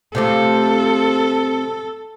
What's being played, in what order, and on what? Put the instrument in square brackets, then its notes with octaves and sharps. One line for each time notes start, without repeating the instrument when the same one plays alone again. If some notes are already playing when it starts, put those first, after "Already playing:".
[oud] C3 F3 A3 [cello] A4